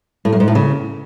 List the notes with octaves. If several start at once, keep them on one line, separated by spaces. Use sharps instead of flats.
A2
F#2
G#2
A2
C#3